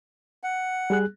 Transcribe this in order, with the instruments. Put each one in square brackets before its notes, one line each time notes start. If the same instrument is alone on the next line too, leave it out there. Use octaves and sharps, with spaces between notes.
[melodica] F#5
[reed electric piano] G3 G#4 F#6